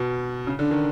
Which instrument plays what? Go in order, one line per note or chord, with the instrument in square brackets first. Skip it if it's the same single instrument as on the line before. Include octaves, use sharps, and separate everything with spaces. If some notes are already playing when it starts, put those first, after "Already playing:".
Already playing: [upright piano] B2
C#3
D3
D#3